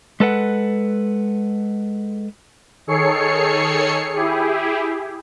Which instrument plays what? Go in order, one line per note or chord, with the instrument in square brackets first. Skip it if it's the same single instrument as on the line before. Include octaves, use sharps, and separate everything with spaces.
[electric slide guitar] G#3 A4 B4 F#5
[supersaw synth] D#3 G#4 A4 C#5 C7 C#7
E4 G4 G#4